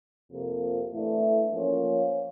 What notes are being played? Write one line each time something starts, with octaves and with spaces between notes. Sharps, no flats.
F2 C3 F3 A#3
A2 E3 A3 D4
F3 A#3 C#4 F4